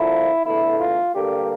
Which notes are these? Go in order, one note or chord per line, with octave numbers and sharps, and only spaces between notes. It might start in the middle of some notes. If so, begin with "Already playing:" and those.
Already playing: F2 D3 F3 A#3 E4
E2 D3 A3 E4
F4
G2 D3 G3 A#3 G4